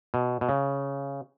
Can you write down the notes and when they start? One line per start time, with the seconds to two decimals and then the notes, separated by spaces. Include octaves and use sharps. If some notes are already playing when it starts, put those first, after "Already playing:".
0.14 B2
0.41 B2
0.49 C#3